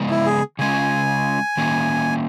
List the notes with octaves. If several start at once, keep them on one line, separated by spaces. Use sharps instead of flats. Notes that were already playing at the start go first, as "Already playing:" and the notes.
Already playing: C#3 G#3 B3
E4
G#4
C#3 G#3 C#4 G#5
D#3 A#3 C#4